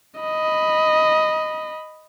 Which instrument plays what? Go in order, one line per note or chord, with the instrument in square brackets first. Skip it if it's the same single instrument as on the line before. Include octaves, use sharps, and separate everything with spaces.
[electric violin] D#5 B5